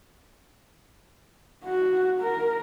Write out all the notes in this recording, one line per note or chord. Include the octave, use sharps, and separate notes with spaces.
F#4
A#4